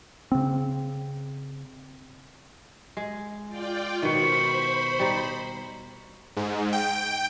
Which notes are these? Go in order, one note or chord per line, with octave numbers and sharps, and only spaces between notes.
C#3 C4
G#3
F4 D5 G5
B2 D#3 C5 B5 C#6
G3 D#4
G#2
G5